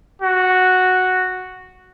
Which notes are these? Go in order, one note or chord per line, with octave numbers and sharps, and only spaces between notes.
F#4